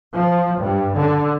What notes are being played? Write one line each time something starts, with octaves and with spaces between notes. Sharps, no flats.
F3
G2
D3